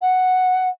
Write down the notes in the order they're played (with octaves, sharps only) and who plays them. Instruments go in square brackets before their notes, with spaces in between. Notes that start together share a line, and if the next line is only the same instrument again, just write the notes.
[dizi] F#5